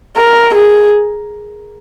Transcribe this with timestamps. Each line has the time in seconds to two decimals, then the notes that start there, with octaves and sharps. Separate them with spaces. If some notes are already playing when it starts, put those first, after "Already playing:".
0.17 A#4
0.55 G#4